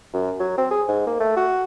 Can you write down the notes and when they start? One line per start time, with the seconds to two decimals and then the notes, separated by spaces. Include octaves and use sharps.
0.14 F#2
0.40 F#3
0.58 C4
0.71 G#4
0.88 G#2
1.07 A#3
1.20 A3
1.36 F#4